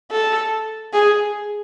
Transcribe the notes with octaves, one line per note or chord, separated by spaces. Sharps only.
A4
G#4